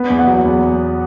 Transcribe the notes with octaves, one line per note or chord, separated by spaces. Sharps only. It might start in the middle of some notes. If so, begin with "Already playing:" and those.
Already playing: B3
E2
F#5
F#3
E2